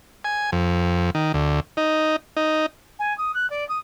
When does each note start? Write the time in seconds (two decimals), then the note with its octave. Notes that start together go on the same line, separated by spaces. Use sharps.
0.25 G#5
0.52 F2
1.15 D#3
1.34 D2
1.77 D#4
2.37 D#4
2.99 G#5
3.17 D#6
3.34 F#6
3.50 D5
3.68 D#6